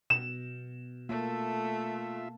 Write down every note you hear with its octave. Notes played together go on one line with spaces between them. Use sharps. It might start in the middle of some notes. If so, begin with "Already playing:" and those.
B2 E7
A3 A#3 F4 E5